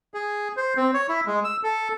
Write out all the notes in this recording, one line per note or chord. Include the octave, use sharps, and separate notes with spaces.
G#4
C5
C4
C#5
E4
G#3
E6
A4